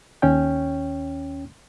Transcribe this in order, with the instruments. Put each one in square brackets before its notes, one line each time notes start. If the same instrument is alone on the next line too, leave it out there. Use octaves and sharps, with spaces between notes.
[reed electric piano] D#2 C#4 C#5 G5